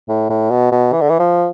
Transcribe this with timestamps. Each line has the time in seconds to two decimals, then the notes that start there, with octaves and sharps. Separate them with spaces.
0.08 A2
0.30 A2
0.50 B2
0.72 B2
0.92 E3
1.01 D3
1.09 E3
1.19 F3